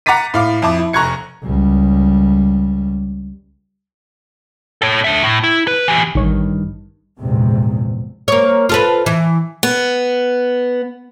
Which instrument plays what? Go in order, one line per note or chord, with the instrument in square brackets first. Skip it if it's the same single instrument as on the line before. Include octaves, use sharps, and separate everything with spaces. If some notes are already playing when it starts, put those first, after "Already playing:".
[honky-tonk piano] F#5 A#5 D6 A6 B6 D#7
A2 F5 D6
F2 E4 A5 D6
E4
F1 A#5 C#6 F#6 G#6 C#7
[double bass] C#2 G3
[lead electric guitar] A4 C#5
D4 E5
A2
E4
B4
E3 G4
[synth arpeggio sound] A1 C#5 [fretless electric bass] G2 D#3
[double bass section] A#1 E2 G#2 C3
[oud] A#3 C#5
F4 A4 B4
E3
[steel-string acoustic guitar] B3